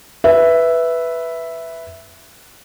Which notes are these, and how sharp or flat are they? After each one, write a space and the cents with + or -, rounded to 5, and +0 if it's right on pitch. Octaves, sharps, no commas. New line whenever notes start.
B4 +0 E5 +0